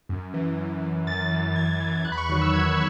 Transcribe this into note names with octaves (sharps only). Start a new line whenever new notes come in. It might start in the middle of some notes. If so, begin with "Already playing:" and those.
F#2
E3
F#2
E3
F#2 A6
E3 A6
A6
F#2 G#6
E3
G#6
E2 F#6
B5
C#6
D#3 F#3
E6
E2 G#6